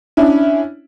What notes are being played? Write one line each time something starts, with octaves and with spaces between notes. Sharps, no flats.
C#4 D4 E4